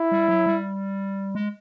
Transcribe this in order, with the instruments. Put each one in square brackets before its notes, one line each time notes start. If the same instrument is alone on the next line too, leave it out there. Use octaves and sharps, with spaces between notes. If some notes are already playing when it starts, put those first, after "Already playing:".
Already playing: [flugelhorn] E4
[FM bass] G3
F#3
G3
G#3